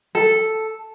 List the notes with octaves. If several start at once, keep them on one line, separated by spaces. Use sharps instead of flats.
A4